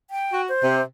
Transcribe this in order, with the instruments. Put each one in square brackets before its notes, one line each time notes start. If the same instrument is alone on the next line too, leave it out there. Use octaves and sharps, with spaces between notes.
[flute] G5
[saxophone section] F#4
[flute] C5
[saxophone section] C3